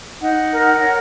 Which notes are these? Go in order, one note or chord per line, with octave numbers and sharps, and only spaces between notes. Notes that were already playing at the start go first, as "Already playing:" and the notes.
D#4 F#5
A#4
C#5